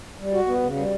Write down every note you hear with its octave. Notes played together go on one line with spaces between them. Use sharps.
G3
F#4
B3
C#3
G3